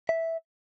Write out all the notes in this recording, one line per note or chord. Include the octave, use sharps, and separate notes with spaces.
E5